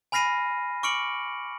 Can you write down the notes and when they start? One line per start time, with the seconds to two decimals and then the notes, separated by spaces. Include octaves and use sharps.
0.12 G#5 B5 F6 A#6 C7 D#7
0.83 C#6 D6 F6 C#7 D7 F#7